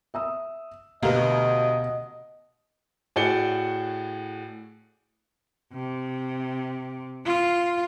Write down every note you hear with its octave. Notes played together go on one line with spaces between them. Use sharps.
E5 D#6 E6
D2 B2 G4 B4 D#5 F5 A#5
A2 F#4 G#4 D5 C#7 G7
C3
F4